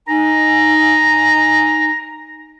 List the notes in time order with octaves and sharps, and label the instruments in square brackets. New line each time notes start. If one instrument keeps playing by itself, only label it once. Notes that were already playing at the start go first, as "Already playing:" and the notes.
[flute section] D#4 G#5 [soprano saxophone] A#5